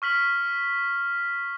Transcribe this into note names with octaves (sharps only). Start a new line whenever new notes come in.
C#6 F6 B6 F#7